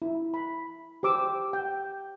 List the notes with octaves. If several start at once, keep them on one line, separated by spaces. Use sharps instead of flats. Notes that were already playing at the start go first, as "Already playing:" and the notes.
E4
B5
G4 C5 D6 E6
G5